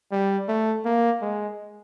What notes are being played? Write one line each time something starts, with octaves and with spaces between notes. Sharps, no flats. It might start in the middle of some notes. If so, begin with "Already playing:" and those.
G3
A3
A#3
G#3